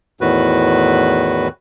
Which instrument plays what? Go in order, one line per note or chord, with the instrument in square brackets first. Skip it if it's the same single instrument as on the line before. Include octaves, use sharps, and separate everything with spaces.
[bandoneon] E2 A2 D#3 F#4 B4